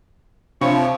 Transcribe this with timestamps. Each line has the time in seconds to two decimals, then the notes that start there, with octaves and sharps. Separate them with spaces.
0.61 C3 F3 D4 C#5 F5 B5